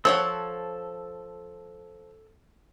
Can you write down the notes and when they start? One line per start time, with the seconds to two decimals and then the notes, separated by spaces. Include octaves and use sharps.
0.05 F3 A4 C#5 F#5 E6